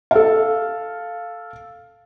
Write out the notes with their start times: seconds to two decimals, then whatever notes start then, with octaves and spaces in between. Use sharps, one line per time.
0.11 A4 F5